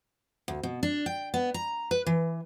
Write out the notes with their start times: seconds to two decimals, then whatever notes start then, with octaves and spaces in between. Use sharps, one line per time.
0.48 D2
0.63 B2
0.83 D4
1.06 G5
1.34 B3
1.54 A#5
1.91 B4
2.06 E3